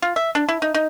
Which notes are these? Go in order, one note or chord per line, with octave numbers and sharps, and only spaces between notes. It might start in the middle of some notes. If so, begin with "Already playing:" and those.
F4
E5
D4
E4
D#4
D#4